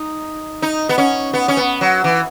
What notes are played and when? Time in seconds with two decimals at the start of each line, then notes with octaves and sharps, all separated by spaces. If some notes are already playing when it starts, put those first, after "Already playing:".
Already playing: D#4
0.62 D#4
0.89 B3
0.98 C#4
1.33 B3
1.48 C#4
1.57 B3
1.81 F#3
2.04 E3